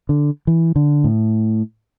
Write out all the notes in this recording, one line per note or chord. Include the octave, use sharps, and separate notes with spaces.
D3
E3
D3
A2